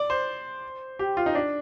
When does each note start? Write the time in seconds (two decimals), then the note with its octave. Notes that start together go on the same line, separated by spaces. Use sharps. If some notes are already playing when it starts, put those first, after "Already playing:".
Already playing: D5
0.10 C5
0.99 G4
1.17 F4
1.26 D#4
1.35 D4